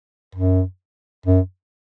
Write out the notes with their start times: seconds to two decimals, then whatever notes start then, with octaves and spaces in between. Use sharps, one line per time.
0.35 F#2
1.26 F#2